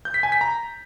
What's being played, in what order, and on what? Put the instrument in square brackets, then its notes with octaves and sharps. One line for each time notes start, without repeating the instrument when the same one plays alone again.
[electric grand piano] G6
B6
G#5
B6
A#5